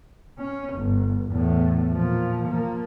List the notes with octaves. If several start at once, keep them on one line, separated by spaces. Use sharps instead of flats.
C#4
G1
E2 A2
A#2 F3
F3 A#3